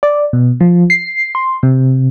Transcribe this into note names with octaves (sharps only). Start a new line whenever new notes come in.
D5
B2
F3
C7
C6
C3